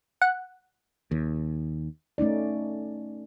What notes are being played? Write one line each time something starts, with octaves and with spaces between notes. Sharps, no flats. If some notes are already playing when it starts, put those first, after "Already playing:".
F#5
D#2
A3 C#4 D#4 D5